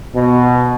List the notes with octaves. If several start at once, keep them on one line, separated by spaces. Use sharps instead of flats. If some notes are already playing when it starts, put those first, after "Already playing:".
B2